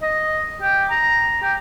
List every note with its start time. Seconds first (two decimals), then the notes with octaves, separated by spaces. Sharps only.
0.02 D#5
0.62 G4
0.90 A#5
1.42 G4